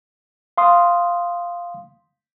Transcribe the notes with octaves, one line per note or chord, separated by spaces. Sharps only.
F5 C6 D#6